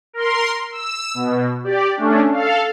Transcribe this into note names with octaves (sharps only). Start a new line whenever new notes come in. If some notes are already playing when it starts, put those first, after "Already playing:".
A#4 C6
E6
B2
G4 D5
A3 C#4 D4
A4 F5